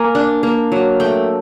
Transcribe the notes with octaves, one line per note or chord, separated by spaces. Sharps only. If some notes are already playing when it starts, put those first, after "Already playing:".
Already playing: A#3 G#5
D4
A#3
F#3
A3 G5